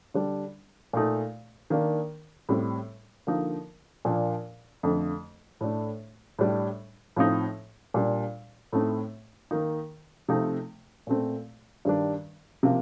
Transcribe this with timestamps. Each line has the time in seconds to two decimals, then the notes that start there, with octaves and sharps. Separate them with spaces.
0.14 D3 G3 D4
0.93 A#2 A3 D#4
1.70 D#3 A#3 D4
2.49 A2 G3 C4
3.27 D3 F3 A#3 D#4
4.05 A#2 F3 A#3 D4
4.83 F2 D3 A3
5.61 A2 A3 D4
6.39 A2 G3 D4
7.16 A2 F3 C4 D#4
7.94 A#2 G3 D4
8.73 A2 A3 C4 D#4
9.51 D#3 A#3 D#4
10.28 C3 F3 A3 C4 D#4
11.07 A#2 A3 C4
11.85 G2 D#3 G3 D4
12.63 C3 F3 A#3